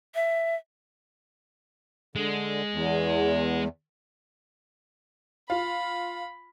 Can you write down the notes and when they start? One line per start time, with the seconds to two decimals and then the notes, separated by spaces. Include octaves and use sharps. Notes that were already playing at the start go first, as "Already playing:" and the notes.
0.15 E5
2.16 D3 G#3
2.73 E2
5.50 F4 B5